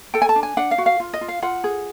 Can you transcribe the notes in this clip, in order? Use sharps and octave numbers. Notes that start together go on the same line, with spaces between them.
A4 G5
G#5
A5
D4
G#5
D4 F#5
F5
F#4
F5
F4
D#5
F4
F5
F4 F#5
G#4